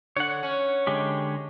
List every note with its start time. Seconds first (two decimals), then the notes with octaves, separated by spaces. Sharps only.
0.17 D3 C#5 F#5
0.43 C#4
0.87 D3 G#3 G4